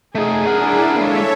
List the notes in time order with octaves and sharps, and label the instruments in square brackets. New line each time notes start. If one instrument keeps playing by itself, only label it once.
[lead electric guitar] A3 D#4 [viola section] G#4
[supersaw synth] D4 E4 [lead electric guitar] A#4 F#5
[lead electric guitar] G#3 A#3 [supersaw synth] A4 C#5 E5